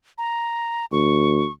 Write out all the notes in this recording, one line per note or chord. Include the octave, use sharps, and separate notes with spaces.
A#5
D2 C#6